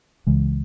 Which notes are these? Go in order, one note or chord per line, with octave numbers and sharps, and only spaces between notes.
C#2 C#3 E3 G#3